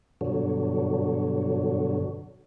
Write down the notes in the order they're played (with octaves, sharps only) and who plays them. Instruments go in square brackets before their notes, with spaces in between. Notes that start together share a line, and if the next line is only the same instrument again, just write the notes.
[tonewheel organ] G2 B2 D3 F#3